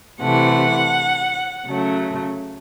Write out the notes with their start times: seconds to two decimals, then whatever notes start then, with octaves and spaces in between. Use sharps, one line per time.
0.21 C3 E3 A3 F#5
1.67 C#3 F#3 A3